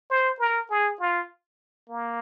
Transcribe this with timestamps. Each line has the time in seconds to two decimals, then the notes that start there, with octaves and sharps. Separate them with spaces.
0.10 C5
0.40 A#4
0.71 G#4
1.00 F4
1.89 A#3